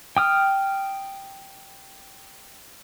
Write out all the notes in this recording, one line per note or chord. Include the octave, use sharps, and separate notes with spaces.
G5 D#6 F6